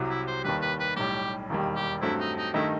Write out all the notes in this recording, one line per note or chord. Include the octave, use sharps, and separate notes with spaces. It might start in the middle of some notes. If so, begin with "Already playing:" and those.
Already playing: C2 C3 F#3
E4
C5
D#2 D#3 G3 B4
B4
B4
B1 A2 G3 G4
E1 D#2 D#3 G3
G4
G2 F#3 A3 C4 E4
D#4
D#4
G2 D#3 A3 D#4 E4